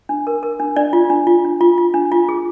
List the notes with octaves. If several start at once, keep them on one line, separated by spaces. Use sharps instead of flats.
D4
A#4
A#4
D4
D4 D5
F4
D4
F4
D4
F4
F4
D4
F4
G#4